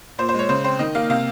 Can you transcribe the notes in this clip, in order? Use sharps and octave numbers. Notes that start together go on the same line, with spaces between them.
A#2 C5
C5
G#3 C#5
C#3 C5
C4 C5
D#3 D#5
A#3 F5
C3 F5